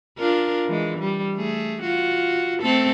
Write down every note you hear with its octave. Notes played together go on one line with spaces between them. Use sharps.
D4 F4 A#4
E3 G#3
G3
A3 G#4
F4 F#4
A3 C4 A4